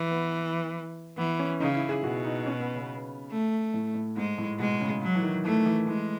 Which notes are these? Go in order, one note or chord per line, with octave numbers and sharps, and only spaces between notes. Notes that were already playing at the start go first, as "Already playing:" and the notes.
Already playing: E3
B3
E3 B3
C#4
C#3 D#4
E4
G#4
B2 F#4
D#4
C#4
B3
C#3
A3
A2
A2
G#2 G#3
A2
B2 G#3
C#3
F#3
E3
D#3
E3 A3
E3
E3 G#3